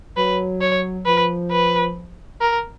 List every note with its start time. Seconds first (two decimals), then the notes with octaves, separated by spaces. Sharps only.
0.16 F#3 B4
0.61 C#5
1.06 F3 B4
1.52 B4
2.41 A#4